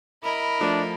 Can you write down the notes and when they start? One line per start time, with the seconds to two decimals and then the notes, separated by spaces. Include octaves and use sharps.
0.23 E4 A#4 D#5 B5
0.60 F3 A3 D4